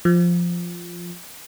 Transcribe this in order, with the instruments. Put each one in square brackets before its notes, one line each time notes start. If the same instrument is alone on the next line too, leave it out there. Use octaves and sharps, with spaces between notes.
[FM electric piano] F3